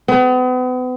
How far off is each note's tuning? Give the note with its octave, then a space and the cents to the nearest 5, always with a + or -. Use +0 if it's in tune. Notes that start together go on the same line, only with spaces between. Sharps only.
B3 +40